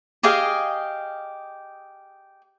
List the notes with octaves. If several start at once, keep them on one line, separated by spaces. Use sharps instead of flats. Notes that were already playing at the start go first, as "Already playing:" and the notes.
G4 G#4 D#5 F5